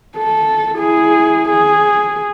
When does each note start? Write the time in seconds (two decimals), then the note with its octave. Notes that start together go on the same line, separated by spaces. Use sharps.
0.17 A4
0.76 E4 G#4
1.49 G#4